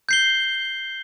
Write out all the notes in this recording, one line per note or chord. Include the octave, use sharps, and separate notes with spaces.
G6 C7 G7